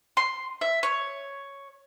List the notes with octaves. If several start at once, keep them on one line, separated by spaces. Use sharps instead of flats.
C6
E5
C#5